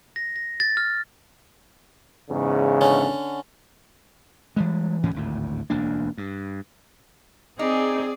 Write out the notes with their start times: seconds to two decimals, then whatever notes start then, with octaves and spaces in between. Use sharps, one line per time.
0.16 A#6
0.36 A#6
0.60 A6
0.77 F6
2.31 E2 G#2 C#3
2.81 D3 C#4
4.56 E3 G3 G#3
5.03 D2 G#2 E3 C#4
5.14 G#1 D2 A2
5.70 E1 D2 A#3 D4
6.18 G2
7.59 C4 D#4 G#4 D5